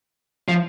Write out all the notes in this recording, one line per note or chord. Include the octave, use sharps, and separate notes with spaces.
F3